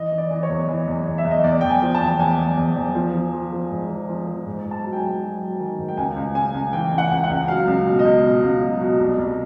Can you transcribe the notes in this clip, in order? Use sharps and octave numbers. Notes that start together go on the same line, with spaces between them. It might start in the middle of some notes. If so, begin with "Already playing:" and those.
Already playing: E3 D#5
E3
D5
E3
C#5
E2
E3
E2
E2
E5
E2
D#5
E2 D5
E2 G5
G#5
F3
A5
E2
E2 G#5
E2
E2
E2
F3
F3
F3
F3
G#2
F3
F3
F3
G#2
G#2
A5
F#3
G5
G#5
G#2
F#3
F#3
D#3
G#2
G5
C#2 G#5
C#2
C#2 G#5
C#2
E3 G5
C#2
F#5
C#2
F#5
C#2
F#3 F5
C#2
B2
D#5
C#2
B2
C#2
F#3
B2
C2
C2